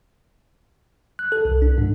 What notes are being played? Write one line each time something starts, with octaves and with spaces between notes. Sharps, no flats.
F#6
A4
C2
D4
G#2